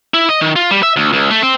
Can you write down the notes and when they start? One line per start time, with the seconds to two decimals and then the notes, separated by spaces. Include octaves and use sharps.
0.14 E4
0.29 D#5
0.41 D#3
0.56 F4
0.71 G3
0.83 E5
0.96 D2
1.13 C#2
1.31 A3
1.42 C4